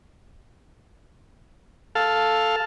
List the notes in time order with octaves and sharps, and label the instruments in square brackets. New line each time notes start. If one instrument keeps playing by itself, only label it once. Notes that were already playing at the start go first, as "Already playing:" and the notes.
[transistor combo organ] A4 F5